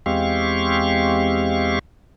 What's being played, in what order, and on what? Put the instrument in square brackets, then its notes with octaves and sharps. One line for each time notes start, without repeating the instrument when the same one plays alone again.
[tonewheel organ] E2 G#3 C4 G4 F5 C#6